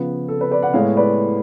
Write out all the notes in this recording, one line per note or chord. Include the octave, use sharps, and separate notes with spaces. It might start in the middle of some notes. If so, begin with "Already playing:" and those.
Already playing: C#3 F3 B3
A4
B4
B4 D5
D5 F#5
A2 G#3 B3 C#5 F5
B4 D5